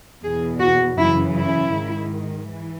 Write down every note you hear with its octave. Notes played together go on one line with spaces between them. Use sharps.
E2 B2 G#4
F#4
F#2 C#3 E3 E4
E4
G#2 D#3
E3